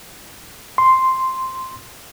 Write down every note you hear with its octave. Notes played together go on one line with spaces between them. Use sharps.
C6